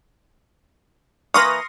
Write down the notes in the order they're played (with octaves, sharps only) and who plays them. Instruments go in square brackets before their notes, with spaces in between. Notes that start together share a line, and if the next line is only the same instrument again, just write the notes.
[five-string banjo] E3 A#3 B4 [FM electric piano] C6 C#6 F6 [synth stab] D#6 A#6